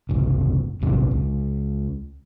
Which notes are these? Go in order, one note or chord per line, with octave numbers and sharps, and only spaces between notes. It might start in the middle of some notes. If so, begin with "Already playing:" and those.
F#1 C2
A#1 E2 C3 E3
C#2